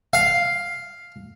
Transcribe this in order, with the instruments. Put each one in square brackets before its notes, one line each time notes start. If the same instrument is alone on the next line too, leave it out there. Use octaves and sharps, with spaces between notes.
[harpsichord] F5